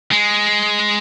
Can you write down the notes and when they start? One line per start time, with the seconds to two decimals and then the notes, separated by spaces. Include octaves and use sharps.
0.12 G#3